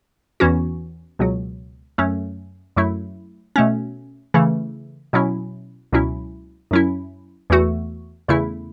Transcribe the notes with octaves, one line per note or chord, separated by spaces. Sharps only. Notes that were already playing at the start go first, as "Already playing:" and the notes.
E2 E3 C#4 F#4
C#2 B2 F#3
F#2 F#3 A3 C#4
F#2 F#3 A3 E4
B2 A3 C#4
C#3 E3 A3
B2 F#3 C#4 E4
C#2 B2 F#3 C#4 E4
F#2 F#3 C#4 E4
E2 E3 A3 F#4
E2 C#3 A3 E4